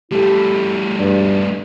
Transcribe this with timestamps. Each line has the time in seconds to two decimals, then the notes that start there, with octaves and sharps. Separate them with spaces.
0.12 G3 A3 E4 G4 A4
0.99 G2 D5